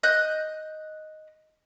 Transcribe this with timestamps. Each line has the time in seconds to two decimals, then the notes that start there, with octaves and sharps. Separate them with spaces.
0.03 D#5 F#6 G6